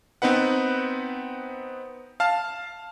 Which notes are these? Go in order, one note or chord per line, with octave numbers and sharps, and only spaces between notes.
B3 C4 D#4 B4 F#5
F5 A5 F6